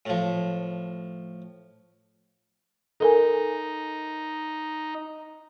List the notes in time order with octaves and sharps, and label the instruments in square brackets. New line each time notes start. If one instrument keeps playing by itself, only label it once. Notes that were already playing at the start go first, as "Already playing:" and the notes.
[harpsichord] A2 F3
[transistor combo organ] D#4 [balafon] A4 A#4 G#5